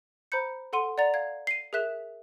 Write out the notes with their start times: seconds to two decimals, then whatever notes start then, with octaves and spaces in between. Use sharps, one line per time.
0.32 C5 A#5 B5 G6 C#7
0.73 A4 F#5 C6 D#7
0.98 D5 F#5 A#5 A6 F7
1.14 F5 G#6
1.47 C7 D#7
1.73 G#4 A#4 E5 F#6 B6 E7